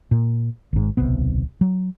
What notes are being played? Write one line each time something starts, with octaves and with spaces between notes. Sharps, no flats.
A#2
G#1 G#2
D1 B1 C3 B3
F#3